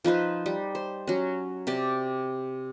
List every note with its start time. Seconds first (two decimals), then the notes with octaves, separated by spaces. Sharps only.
0.04 F3 D#4 B4 C5
0.46 G3
0.75 C5
1.07 F#3 C#4
1.67 C3 G4 D5